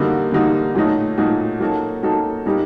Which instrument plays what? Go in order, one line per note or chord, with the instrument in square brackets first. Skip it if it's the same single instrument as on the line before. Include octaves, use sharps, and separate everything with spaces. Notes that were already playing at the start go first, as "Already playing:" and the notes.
Already playing: [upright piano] D3 G3 A#3 D#4 F#4
D3 G3 A#3 D#4 F#4
A#2 F#3 A3 D#4 F#4
A#2 F#3 A3 D#4 F#4
F#3 A#3 D#4 F#4 A4
F#3 A#3 D#4 F#4 A4
A#2 G3 A#3 D#4 G4